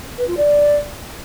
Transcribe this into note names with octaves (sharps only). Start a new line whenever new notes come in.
B4
F4
D5